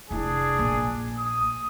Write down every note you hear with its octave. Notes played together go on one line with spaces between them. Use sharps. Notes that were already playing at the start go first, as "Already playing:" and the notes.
F1 D4 E4 G#4
A#1
D#6